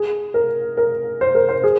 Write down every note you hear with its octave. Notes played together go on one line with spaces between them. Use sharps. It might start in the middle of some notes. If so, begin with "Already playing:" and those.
Already playing: G#4
A#4
A#4
C5
A#4
C5
G#4